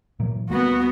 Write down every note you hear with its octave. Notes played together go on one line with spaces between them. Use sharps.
A#2 E3 F#3
D2 G3 A#3 B3 F#4